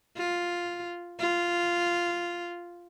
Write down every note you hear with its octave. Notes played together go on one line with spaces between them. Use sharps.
F4
F4